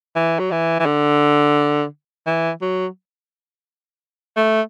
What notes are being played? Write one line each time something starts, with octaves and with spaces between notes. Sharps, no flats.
E3
F#3
E3
E3
D3
E3
F#3
A3